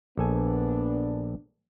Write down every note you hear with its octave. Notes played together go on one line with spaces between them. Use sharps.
A#1 B3 D4 A4 G#5